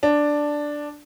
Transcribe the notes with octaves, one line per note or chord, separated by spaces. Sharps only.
D4